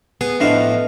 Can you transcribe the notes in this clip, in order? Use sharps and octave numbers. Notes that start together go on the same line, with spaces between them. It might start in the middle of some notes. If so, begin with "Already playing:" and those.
B3 G#4
A2 F3 D4 D#5 F5